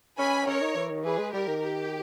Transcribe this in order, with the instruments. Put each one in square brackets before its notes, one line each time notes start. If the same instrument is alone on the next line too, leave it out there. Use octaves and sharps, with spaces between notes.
[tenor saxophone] C#4 [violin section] G#5 B5
[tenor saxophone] C#4 [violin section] A#4 C#5
[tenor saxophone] D#4
E3
D#3
[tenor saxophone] E3 [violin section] G#4 B4
[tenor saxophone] G#3
[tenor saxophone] G3 [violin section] G4 A#4
[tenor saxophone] D#3
[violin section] G4